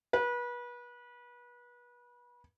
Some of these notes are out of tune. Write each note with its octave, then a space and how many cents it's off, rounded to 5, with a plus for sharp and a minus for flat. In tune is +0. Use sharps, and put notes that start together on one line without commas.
B4 -30